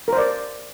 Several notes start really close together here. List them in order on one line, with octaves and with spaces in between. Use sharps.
A#4 C5 D5